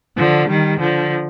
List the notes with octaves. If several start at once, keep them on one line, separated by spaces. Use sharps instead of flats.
D3 F3
D#3 G3
D3 F3